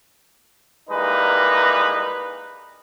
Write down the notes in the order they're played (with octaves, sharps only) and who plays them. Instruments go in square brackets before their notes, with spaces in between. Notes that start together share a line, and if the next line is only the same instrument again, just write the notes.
[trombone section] E3 G3 G#3 A#3 D#4 B4